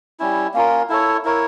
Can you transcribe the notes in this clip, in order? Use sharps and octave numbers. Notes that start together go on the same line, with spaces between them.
G3 C#4 E4
A#3 C#4 F4 A#4
E4 A4 C#5
E4 A#4 C#5